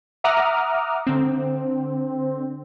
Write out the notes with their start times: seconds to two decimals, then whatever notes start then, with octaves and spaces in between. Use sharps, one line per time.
0.24 E5 F#5 A#5 D6 D#6 F6
1.07 D3 C4